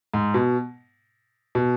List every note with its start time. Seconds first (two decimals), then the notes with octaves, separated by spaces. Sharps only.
0.14 G#2
0.34 B2
1.55 B2